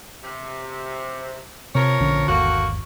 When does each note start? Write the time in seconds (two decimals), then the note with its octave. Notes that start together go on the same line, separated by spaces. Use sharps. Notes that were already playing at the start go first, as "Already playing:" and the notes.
0.23 C3
1.75 C3 F3 A#4 C#5
2.00 A#1 D3 C#4
2.28 G1 D#2 A3 A#3 F#4